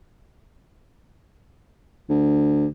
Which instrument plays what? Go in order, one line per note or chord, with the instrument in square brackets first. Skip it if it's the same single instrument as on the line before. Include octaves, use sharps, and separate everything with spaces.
[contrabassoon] D2